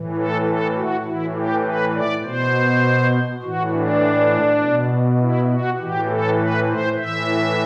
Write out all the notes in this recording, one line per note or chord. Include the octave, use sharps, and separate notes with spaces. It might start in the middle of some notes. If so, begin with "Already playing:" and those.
Already playing: A2 E3
A4
A4
F#4
A2 E3 E4
G4
B4
D5
B2 C5
A2 E3 F#4
D4
B2
E4
F#4
A2 E3 G4
A4
B4
C5
A2 E3 E5